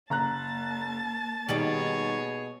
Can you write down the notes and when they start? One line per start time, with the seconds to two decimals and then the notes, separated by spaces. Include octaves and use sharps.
0.10 F#1 A#3 A5 A#5 F#6 A6
1.49 B2 D#3 G3 G#4 C#5 D5 F#7